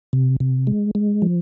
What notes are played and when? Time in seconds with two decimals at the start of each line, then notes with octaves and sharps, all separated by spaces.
0.13 C3
0.40 C3
0.67 G#3
0.95 G#3
1.22 F3